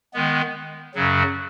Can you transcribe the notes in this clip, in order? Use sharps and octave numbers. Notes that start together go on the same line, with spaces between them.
D#3 G#3 B3
F#2 C#3 F#3